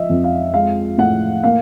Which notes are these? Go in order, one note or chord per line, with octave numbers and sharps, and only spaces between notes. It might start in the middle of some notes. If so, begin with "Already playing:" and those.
Already playing: F3 D#5 E5
F2
F5
G#3 F5
A2 F#5
A#3 F5